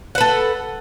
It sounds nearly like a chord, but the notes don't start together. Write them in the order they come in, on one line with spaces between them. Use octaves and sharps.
F#5 B4 A4